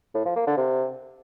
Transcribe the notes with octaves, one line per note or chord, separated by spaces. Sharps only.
A2
F3
A#3
D3
C3